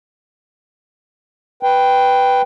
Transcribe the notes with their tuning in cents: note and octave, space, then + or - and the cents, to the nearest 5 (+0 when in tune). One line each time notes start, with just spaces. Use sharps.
B4 +0 G5 +0